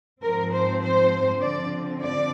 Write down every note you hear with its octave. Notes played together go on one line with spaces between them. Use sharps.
G#2 F3 C4 A#4
C5
C5
D3 F3 C4 D5
D5